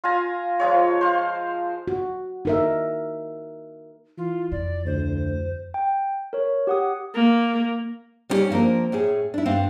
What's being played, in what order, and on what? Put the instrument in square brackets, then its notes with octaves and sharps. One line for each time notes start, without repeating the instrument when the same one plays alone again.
[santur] F4 F5 G#5 A#5
F3 G#3 C#5
C5 F5
[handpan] F#4
D#4 A#4 E5
[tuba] E3 [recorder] F4
[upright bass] F2 E4 [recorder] D5
[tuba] D2 [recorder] C5
[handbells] G5
A#4 C#5
G4 F#5 D#6
[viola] A#3
[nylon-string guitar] G3 B3 C#4 D#4 G4 D5
F3 A#3 C4 D4 A#4
A2 C#4 G#4
D4 E4
G2 B3 C4 D4 F5